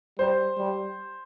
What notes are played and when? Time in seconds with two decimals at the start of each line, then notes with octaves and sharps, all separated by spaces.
0.19 G3 C5
0.58 G3